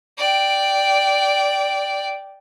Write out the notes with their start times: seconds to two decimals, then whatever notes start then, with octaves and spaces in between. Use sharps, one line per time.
0.18 D5 G5